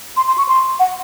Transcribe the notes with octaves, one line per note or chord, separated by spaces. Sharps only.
C6
C6
C#6
C6
F#5